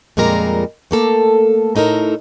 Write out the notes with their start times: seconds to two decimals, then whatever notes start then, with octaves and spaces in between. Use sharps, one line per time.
0.17 F2 A#2 G3 G#3 A#4 A#5
0.91 A3 A#3 A4
1.76 A2 D#4 A4 A#4